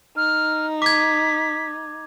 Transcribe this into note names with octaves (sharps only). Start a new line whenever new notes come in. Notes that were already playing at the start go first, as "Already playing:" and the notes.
D#4 F6
D6 G#6 B6